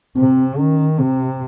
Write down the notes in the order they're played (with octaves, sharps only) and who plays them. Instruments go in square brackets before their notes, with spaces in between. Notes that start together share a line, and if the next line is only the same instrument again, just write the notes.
[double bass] C3 [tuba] C4
[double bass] D#3 [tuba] C#4
[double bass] C3 [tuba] C4